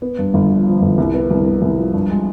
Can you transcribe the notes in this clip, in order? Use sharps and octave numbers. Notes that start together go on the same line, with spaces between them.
B3
G2
G1
F3
F3
G1
C2
B3
C2
B3
C2
F3
G2
G#3